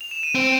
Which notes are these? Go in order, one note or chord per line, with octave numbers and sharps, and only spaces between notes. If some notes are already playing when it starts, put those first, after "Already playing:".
F7
E7
D#7
C4 D7